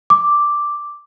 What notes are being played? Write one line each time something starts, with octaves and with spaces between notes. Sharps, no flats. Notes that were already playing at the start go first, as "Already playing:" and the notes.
D6